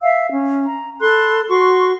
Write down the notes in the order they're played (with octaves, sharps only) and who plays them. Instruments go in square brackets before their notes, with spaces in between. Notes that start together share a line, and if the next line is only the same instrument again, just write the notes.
[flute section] E5 F5 E6
C#4
A#5
A4 B5 C6 F#6
F#4 C6 C#6